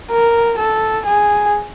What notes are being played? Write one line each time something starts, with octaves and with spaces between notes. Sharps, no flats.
A#4
A4
G#4